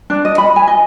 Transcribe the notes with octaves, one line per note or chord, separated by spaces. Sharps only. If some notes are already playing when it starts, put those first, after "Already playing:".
D4
D#5
B5
G#5
D#5